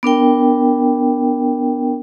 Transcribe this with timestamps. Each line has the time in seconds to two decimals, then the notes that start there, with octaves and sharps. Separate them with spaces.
0.03 B3 D4 A#4 G5